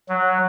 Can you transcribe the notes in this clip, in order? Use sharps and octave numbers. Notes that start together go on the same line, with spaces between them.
F#3